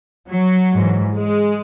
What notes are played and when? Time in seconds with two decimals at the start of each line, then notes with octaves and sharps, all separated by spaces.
0.29 F#3
0.72 G#2 E3
1.14 G#3